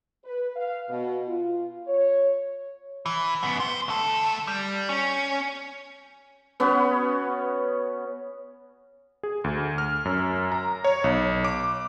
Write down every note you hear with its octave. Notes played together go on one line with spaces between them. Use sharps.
B4
F5
B2
F4
C#5
E3
F#2 B3
C5
D2 A4
G3
C#4
B3 C#4 F#4 B4
G#4
D2
F6
F#2
A#5
C#5
B1
D6